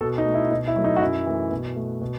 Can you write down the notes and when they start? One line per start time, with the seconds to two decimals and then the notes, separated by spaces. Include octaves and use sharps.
0.01 B2 A4
0.18 D#4
0.26 A3
0.34 E4
0.51 B2 D#4
0.68 E4
0.76 F#3 A3
0.84 D#4
0.96 F#4
1.01 F#2 E4
1.26 E3 A3
1.51 B2
1.76 A3
2.01 B2